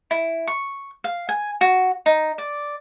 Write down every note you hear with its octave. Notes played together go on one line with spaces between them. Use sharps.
E4
C#6
F5
G#5
F#4
D#4
D5